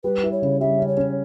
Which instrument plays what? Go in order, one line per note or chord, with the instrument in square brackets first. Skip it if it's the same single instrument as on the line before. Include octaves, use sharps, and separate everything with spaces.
[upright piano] G3 [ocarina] B4
[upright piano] E4
[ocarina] C#5
[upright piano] C#3
[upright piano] G3 [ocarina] E5
[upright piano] C#4
[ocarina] C#5
[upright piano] C#4